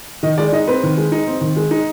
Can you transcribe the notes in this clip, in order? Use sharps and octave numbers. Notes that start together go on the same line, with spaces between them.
D#3 D#5
G#3 D5
D#4 D#5
C4 B4
D#3
G#3
D#4
C4
D#3
G#3
D#4